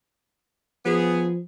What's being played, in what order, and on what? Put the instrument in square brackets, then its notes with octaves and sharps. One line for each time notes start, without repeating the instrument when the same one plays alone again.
[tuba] F3 [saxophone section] B3 G#4